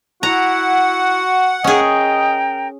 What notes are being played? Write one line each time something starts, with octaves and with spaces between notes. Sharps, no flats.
E4 F#4 F#5 A#5
C#4 G#4 A#4 D#5 G5